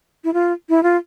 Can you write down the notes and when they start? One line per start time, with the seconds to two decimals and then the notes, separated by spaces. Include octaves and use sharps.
0.24 E4
0.34 F4
0.69 E4
0.83 F4